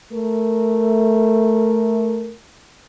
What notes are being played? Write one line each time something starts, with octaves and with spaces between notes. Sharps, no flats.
A3 A#4